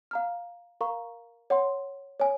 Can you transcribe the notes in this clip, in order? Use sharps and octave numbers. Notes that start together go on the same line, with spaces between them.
F5 A#5 F6
A#4 F5 A#5 C#6
C#5 F#5 C6
C#5 G#5